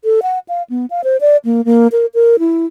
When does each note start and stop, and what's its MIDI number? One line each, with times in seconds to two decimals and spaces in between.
0.04 0.20 69
0.22 0.39 78
0.49 0.63 77
0.70 0.86 59
0.90 1.01 77
1.04 1.17 72
1.21 1.37 74
1.45 1.65 58
1.65 1.87 58
1.92 2.06 70
2.14 2.36 70
2.39 2.66 64